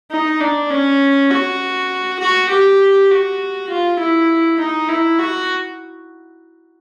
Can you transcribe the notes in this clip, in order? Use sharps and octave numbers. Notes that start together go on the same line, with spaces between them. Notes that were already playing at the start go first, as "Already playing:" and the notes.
D#4
D4
C#4
F#4
F#4
G4
F#4
F4
E4
D#4
E4
F#4